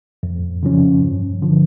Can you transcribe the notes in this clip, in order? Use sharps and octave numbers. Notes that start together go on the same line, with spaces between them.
F2
C#3 F3 C#4
G2
D3 F3